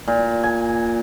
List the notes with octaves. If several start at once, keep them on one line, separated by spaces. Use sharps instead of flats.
A#2
G#5